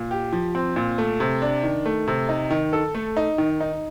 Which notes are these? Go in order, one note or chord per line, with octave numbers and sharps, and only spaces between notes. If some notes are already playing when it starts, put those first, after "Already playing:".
Already playing: A#2
G4
F3
C4
A#2
A3
C3
D4
D#3
A3
C3
D#4
D#3
A4
A3
D#4
D#3
D#4